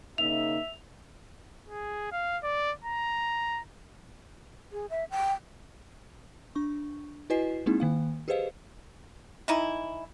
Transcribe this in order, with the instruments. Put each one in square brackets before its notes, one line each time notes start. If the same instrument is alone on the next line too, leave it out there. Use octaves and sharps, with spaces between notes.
[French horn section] C#3 A#3 D#4 [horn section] E5 [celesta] F7
[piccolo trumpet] G#4
F5
D5
A#5
[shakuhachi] G#4
E5
G5
[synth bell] D4 C#6
E4 F#4 B4 D#5 G#5 C7
G#3 A#3 C4 D#4 E4 G#4
D#3 A#3 F5
G4 G#4 B4 C5 D#5 F5
[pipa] E3 D#4 E4